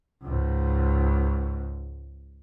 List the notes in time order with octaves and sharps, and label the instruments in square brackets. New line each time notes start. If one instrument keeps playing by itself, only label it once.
[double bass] C#2 G#2